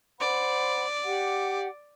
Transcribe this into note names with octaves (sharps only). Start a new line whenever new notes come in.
C5 D5 F#5 B5
G4 F#5